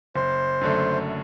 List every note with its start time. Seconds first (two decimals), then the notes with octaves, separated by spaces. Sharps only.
0.15 F#1 C5
0.61 F#2 D3 A3